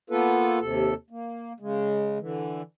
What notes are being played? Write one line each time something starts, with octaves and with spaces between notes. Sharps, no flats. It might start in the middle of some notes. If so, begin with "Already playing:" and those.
A#3 B3 F4 A4 B4
D#2 C3 A4
A#3
C#3 G#3
D3 E3